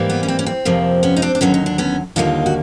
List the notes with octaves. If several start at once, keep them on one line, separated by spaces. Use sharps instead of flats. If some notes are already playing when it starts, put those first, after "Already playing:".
Already playing: G#2 E3 G3 A#3
B3
C#4
C4
C#4
C4
F2 C3 F3 A#3
B3 C#4
D#4
C4 D4
D4
D#2 D3 F#3 B3 C#4
D#4
D4
B3 C#4
D#2 D3 G3 A#3 D#4 F4
F#4